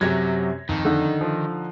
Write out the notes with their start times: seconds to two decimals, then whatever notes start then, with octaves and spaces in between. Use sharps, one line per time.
0.01 F#2 C3 F#3 G4 G#6 A#6
0.69 F2 D#3
0.85 D3 D#4
1.21 F3